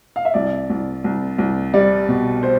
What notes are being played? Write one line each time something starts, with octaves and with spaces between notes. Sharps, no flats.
F5
E5
C2 D5
C2
C2
C2
G3 D5
B2
C5